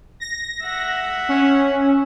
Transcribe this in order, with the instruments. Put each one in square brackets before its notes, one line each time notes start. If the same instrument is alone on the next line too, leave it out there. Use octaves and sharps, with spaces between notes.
[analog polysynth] A#6
[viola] E5 F#5
[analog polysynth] C#4